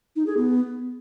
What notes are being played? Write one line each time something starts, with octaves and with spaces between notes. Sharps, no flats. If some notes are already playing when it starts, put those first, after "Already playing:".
D#4
G#4
B3